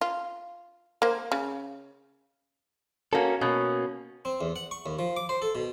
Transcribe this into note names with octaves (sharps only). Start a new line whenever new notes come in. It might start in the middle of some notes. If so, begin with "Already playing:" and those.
F4
A#3 C5
C#3
A#3 C#4 F#4 A4
B2 A#3 C#4
C4
E2
F#5
C#6
D#2
F3
D6
C5
A4
B2